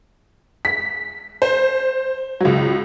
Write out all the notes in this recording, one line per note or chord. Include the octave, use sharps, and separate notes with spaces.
B6
C5
C#2 F#3